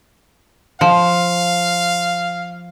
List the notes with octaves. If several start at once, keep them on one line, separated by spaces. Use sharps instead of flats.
F3 F5